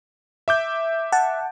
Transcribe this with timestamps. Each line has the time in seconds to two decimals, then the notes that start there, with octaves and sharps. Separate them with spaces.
0.48 E5 D6 G6
1.12 F#5 A5